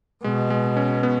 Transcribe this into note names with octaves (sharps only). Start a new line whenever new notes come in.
B2 G#3
G#3
C#4
B3